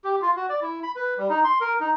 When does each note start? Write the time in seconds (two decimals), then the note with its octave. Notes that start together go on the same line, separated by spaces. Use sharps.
0.04 G4
0.22 F4
0.36 F#4
0.49 D5
0.62 E4
0.83 B5
0.96 B4
1.18 G3
1.29 D#4
1.44 C6
1.61 A#4
1.80 D#4